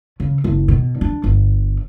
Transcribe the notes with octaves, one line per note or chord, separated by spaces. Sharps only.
C#3
F#1
B2
D4
G1